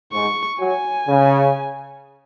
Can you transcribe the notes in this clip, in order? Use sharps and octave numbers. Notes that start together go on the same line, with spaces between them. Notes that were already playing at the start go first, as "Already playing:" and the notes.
G#2 C#6
F#3 G#5
C#3